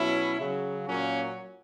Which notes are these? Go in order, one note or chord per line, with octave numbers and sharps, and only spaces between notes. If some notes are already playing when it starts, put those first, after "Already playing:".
Already playing: B2 F#3 C#4 E4
C#3 F#3
A#2 F#3 A#3 C#4